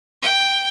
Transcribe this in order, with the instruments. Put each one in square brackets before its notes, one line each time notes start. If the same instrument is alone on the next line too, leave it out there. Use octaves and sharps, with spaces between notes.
[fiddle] G5